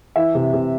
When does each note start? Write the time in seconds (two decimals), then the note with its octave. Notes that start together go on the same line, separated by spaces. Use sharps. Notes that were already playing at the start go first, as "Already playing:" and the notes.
0.16 E3 E5
0.35 C3
0.54 C3